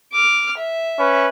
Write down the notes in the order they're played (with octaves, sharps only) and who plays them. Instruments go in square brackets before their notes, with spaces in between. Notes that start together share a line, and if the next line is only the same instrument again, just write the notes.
[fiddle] D6 F6
E5
[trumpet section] C#4 B4